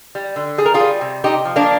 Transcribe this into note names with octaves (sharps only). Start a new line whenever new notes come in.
G3
D3
G3 G#4
A#4
F4 G#4
G3
C3
C3 D#4 G4
F3
A#3 D4